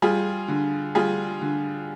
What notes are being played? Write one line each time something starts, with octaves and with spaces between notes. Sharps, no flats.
G3 F4 G#4
D3
G3 F4 G#4
D3